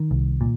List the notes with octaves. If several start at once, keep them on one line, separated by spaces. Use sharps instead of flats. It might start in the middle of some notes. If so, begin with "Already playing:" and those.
Already playing: D#3
C2
A#2